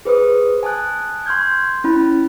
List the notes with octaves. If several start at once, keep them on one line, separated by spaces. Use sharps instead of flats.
G#4 B4 C5 D#6
G#5 A5 D#6 F#6
C6 C#6 F6 G6 G#6
C#4 E4 B5